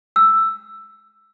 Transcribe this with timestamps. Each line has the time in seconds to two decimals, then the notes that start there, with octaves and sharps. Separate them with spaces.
0.16 E6